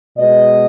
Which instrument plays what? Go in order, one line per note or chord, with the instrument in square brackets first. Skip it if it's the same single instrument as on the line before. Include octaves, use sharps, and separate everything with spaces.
[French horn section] B2 G#3 B3 D#5